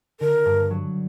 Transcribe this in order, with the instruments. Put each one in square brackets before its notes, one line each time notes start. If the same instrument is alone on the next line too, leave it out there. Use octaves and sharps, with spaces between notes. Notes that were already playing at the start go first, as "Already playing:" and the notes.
[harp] D3 [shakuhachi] A#4
[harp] G2
F#3